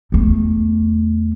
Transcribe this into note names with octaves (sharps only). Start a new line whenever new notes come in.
E2 A3